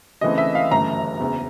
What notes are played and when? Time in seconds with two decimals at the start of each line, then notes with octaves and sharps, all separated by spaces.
0.21 D2 C#3 E3 A3 C4 D#5
0.38 E5
0.55 F5
0.71 G1 F#2 C#3 E3 A3 A#5
1.19 F#1 E2 C#3